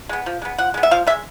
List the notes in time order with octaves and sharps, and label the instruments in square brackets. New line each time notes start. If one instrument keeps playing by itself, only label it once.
[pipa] G#3 B3
F3
G#3 B3
F3 F#5
G#3 B3
E5
F3 F5
B3 E5
G#3